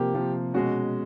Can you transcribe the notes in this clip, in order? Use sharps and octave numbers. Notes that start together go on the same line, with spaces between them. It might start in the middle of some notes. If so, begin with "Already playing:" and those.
Already playing: C3 F3 A#3 G4
C3 F3 A#3
B2 G#3 C#4 F#4